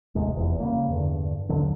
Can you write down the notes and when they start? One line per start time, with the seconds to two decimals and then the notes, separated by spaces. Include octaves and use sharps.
0.15 G1 D#2 C3 G#3
0.35 F1 E2
0.60 C#3 G3 A#3
0.88 E2 G2 D3
1.49 A#1 D#2 D3 F#3